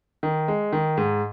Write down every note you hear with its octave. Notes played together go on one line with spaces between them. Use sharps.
D#3
G#3
D#3
G#2